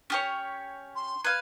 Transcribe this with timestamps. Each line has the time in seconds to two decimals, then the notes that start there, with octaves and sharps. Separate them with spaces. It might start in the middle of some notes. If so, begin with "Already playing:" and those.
0.10 C#4 G4 C#5
0.96 C6
1.24 B4 F5 G#6